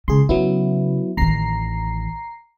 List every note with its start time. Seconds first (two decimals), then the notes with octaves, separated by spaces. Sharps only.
0.08 C#2 C#3 G#4 C6
0.29 C#3 F#3 B3 E4
1.17 A1 D#3 A#5 C7